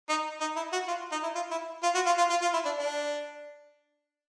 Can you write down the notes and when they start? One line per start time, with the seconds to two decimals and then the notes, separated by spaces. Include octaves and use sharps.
0.10 D#4
0.41 D#4
0.56 E4
0.72 F#4
0.88 F4
1.12 D#4
1.23 E4
1.35 F4
1.51 E4
1.83 F4
1.95 F#4
2.06 F4
2.18 F4
2.30 F4
2.42 F4
2.53 E4
2.65 D4
2.77 D4